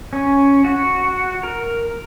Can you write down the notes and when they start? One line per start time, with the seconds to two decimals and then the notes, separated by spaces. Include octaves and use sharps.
0.13 C#4
0.65 F#4
1.43 A#4